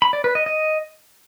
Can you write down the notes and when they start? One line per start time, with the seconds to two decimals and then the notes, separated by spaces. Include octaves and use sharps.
0.02 B5
0.13 D5
0.24 B4
0.35 D#5
0.46 D#5